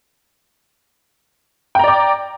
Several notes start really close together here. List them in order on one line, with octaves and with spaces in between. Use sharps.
G5 A#5 D5 D6